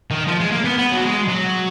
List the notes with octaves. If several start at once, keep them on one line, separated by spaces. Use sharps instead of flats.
D#3
F3
G#3
A#3
B3
B3
F#3
G#3
F#3